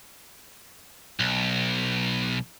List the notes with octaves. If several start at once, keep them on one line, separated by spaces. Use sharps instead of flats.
B1